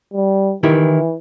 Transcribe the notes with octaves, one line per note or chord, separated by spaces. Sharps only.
G3
D#3 E3 E4 G4